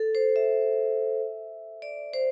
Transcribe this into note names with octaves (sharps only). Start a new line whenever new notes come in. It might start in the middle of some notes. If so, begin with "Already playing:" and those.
Already playing: A4
C5
E5
D5
C5